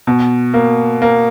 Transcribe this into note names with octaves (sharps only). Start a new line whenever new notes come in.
B2
A#3
A#3